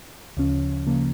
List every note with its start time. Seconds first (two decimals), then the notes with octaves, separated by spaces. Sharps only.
0.37 D2 C#3 F3 C#4
0.87 C#3 F3 A#3